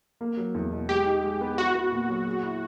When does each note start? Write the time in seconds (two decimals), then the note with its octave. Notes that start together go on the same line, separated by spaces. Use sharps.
0.21 A#3
0.37 F#3
0.55 E2
0.71 B2
0.89 G#3 G4
1.06 D#4
1.23 G#3
1.41 B3
1.58 E4 F#4
1.75 B3
1.92 A#2
2.09 F#3
2.27 G#4
2.43 E4